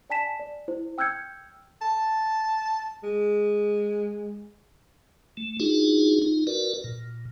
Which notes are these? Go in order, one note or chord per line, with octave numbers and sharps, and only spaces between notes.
D5 G#5 A5 B6 E7
D5
E4 C5
G5 E6 F6 G6 G#6 C#7
A5
G#3
A3
D4 D#4 F4 F#4 G#4
D#4 F4
F#4 A#4 B4 D5
A#2